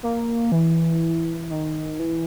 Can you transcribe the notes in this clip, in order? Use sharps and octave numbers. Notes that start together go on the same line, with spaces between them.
A#3
E3
D#3
E3